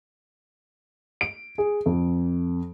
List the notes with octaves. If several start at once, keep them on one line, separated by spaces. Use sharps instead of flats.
D7
G#4
F2